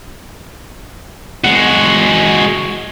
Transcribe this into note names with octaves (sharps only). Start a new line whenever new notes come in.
G#3 F#4